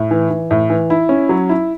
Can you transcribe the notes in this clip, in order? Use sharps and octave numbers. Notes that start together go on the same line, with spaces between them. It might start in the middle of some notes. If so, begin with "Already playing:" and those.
Already playing: A2
E3
E3
A2
E3
E4
C#4
F#3
E4